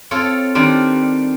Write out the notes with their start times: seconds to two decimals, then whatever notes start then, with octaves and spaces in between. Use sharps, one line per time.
0.11 C4 F4 A4 C#5
0.55 D#3 G3 C4 D4